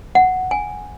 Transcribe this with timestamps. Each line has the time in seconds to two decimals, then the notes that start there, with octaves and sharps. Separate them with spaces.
0.15 F#5
0.51 G#5